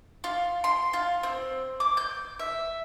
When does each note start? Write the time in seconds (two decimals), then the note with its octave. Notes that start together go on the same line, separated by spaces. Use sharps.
0.24 F4
0.64 C6
0.93 F4
1.23 C4
1.80 D6
1.97 G6
2.39 E5